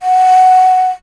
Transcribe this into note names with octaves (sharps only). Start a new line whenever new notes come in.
F#5